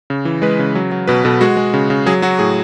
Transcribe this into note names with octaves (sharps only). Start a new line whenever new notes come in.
C#3
E3
G#3 B4
C#3
F#3
F#3
B2 B4
B2 A4
G#3 F#4
G#3
C#3
C#3
F#3 G#4
F#3 F#4
A2 G#4